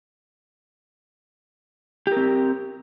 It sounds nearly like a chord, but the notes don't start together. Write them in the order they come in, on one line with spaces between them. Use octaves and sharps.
G4 A#4 C4